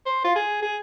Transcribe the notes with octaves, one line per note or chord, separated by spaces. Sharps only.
C5
F4
G#4
G#4